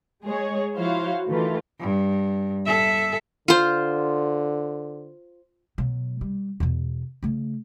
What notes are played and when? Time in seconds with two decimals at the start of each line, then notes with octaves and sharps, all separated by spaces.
0.25 G#3 G#4 C#5
0.76 F3 E4 F#4 C5 C#5 F5
1.28 D#3 E3 A3 F4
1.80 G2
2.66 A4 E5
3.48 D3 F4 C5
5.78 B2 F#3
6.21 G3
6.60 E2 B2
7.23 C#3 A3